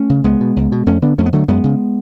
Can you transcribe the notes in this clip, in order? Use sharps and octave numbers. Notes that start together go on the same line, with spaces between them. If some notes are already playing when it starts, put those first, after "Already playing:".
Already playing: A3 C#4
C#3
C#2 G#3 B3
B2
C#2
B2
F2 A3 C#4
D3 B3 D4
F2 A3 C#4
B3
D3 F#3 A3
F#2 G#3 B3
C#3